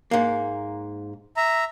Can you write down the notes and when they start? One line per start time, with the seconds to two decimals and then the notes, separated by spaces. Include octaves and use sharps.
0.11 G#2 A#3
1.37 E5 A#5